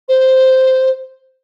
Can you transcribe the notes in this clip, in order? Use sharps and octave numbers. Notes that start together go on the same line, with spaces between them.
C5